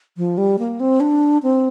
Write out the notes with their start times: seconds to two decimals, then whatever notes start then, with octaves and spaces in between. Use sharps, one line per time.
0.17 F3
0.38 G3
0.59 A#3
0.80 C4
1.00 D4
1.43 C4